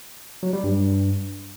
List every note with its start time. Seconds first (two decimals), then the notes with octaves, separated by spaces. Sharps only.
0.43 F#3
0.53 G3
0.64 G2